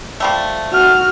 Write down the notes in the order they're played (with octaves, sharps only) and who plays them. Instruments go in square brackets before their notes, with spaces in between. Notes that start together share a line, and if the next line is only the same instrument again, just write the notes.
[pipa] F3 G3 A3
[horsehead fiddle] F#4 [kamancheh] F6